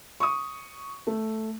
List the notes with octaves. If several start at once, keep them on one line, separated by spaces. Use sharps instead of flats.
C#6 D#6
A3